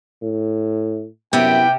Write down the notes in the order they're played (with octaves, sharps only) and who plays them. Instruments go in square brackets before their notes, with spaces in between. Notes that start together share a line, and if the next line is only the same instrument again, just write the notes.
[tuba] A2
[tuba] F#2 [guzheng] C3 [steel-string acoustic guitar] B3 E4 [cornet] G5